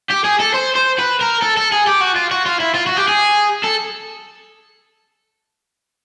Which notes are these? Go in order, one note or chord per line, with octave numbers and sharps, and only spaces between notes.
G4
G#4
A4
C5
C5
B4
A#4
A4
A4
G#4
G4
F#4
F4
F#4
F4
E4
F4
F#4
G4
G#4
A4